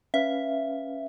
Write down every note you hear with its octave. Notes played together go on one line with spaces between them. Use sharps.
C#4 B4 E5 F5